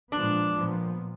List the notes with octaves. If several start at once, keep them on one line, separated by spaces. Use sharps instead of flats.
A#2 F3 G#3 B3 D4
A#2 F3 B3